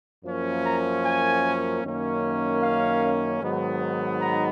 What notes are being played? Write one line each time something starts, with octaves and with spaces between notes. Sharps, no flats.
F#2 F3 A#3 C#4
A#5
G#5
F#2 D#3 A#3 C#4
F5
G#2 D#3 F#3 B3
A#5